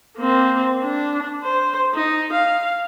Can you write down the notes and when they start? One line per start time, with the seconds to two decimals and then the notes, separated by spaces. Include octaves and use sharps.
0.17 A#3 C4
0.83 D4
1.44 C5
1.95 D#4
2.33 F5